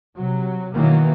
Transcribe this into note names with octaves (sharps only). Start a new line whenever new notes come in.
C3 F#3
B2 D#3 E3 F#3 A#3